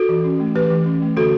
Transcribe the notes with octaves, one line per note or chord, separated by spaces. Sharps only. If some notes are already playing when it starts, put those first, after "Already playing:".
Already playing: F#4 A4
E3
C#4
A3
E3 G4 B4
E3
C#4
A3
D3 F#4 A4